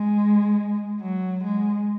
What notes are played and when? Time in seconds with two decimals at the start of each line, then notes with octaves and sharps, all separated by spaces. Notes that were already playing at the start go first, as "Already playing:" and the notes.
Already playing: G#3
1.01 F#3
1.44 G#3